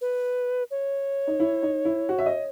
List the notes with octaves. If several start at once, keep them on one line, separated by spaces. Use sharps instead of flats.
B4
C#5
D#4
E4
D#4
E4
F#4
E5
D#5